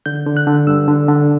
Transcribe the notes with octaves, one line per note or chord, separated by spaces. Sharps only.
D3 G6
D3
F#6
D3
G2 E6
D3
D3